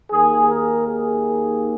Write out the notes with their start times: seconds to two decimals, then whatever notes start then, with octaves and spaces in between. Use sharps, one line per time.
0.11 D#2 D#3 A#3 G#4
0.49 A#4
0.88 G#4